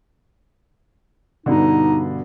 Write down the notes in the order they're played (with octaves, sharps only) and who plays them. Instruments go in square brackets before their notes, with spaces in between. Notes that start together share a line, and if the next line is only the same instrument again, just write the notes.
[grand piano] G2 B2 D3 [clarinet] D#4